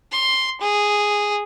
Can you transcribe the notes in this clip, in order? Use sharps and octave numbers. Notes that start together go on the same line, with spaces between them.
C6
G#4